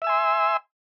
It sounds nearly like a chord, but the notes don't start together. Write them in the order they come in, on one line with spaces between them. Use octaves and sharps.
E5 E6 G#5 C6